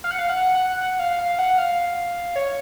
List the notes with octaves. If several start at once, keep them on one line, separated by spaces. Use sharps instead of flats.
F5
F#5
F5
F#5
F#5
F#5
F5
F5
F#5
F5
C#5